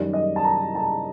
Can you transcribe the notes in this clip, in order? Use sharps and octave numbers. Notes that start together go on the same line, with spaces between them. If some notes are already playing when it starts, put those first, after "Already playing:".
Already playing: F#2 D#3 G3 D5
D#5
A5
A#5
A5